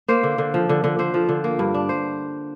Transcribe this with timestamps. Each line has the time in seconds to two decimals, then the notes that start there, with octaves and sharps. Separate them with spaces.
0.08 A#3 C5
0.23 D3
0.38 D3
0.54 F3
0.69 D3
0.84 D3
0.99 D3 C5
1.14 F3
1.29 D3
1.44 A#3
1.59 G2
1.74 D4
1.89 C5